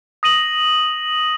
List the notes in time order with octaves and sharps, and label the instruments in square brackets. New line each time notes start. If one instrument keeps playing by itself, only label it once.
[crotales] D#6 A#6 D#7 F#7